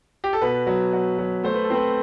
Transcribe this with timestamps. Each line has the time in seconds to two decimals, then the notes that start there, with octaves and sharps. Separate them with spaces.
0.24 G4
0.33 A4
0.41 B2 B4
0.67 F#3
0.93 F#3
1.18 F#3
1.43 A3 C5
1.54 B4
1.64 A4
1.70 C4 B4